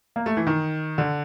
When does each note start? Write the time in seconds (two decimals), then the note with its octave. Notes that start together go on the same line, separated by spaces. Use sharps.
0.16 A#3
0.26 A3
0.37 E3
0.47 D#3
0.98 D3